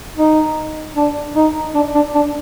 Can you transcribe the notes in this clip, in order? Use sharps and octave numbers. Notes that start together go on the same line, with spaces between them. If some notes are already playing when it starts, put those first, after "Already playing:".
D#4
D4
D#4
D4
D4
D4